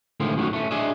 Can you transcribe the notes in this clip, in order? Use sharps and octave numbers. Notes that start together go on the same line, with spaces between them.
A2 D3 D#3 F3 G#3
F#2 A2 D#3 F3 F#3 C#4
A3 C#4
D4 G#4 D#5 E5